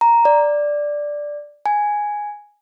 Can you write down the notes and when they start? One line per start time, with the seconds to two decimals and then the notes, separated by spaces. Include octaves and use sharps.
0.01 A#5
0.25 D5
1.66 G#5